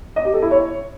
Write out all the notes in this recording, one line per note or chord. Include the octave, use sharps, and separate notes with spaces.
D#5
G4
A4
E4
C#5